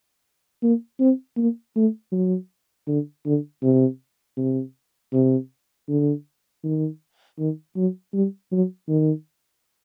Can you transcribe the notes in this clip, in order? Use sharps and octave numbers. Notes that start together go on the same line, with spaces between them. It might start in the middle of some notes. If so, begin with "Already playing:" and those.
A#3
C4
A#3
A3
F#3
D3
D3
C3
C3
C3
D3
D#3
D#3
F#3
G3
F#3
D#3